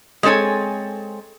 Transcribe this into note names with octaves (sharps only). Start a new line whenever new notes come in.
G#3 C4 A4 C#5 G#5